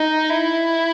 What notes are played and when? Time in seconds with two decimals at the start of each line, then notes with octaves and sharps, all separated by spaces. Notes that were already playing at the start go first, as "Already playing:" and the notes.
Already playing: D#4
0.31 E4